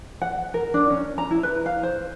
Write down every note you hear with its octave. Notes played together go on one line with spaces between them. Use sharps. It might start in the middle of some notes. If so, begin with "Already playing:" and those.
F#5
A#4
D4
C#4
A#5
E4
B4
F5
C5